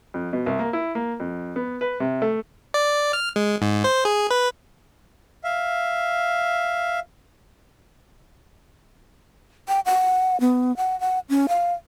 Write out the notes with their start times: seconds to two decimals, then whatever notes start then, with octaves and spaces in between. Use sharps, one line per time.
0.14 F2
0.33 B2
0.46 C2
0.59 A#3
0.73 E4
0.95 A#3
1.20 F2
1.56 B3
1.81 B4
2.00 C3
2.22 A3
2.74 D5
3.13 F6
3.36 G#3
3.62 G#2
3.84 C5
4.05 G#4
4.31 B4
5.44 E5 F5
9.68 G5
9.86 F#5
10.40 B3
10.77 F#5
11.00 F#5
11.30 C#4
11.49 F5